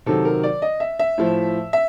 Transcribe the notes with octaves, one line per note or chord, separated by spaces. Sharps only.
C3 D#3 F#3 A4
A#4
D5
D#5
E5
E5
A2 F3
E5